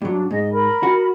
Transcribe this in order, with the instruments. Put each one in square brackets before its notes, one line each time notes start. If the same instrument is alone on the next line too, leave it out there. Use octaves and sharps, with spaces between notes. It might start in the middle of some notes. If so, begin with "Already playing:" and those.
[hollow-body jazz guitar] G2 F#3 [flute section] D4
[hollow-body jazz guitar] G#2 [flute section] D#5
[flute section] A#4 B5
[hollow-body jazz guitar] F#4